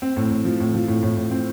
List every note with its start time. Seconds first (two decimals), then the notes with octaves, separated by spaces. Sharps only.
0.02 C4
0.17 A2
0.31 A2
0.45 F3
0.60 A2
0.74 F3
0.88 A2
1.03 A2
1.17 A2
1.31 C4